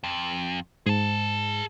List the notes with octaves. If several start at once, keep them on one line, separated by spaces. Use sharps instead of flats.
F2
G#2 G#4 A5